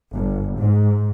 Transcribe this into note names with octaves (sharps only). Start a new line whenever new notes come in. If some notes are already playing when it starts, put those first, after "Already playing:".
G1
G#2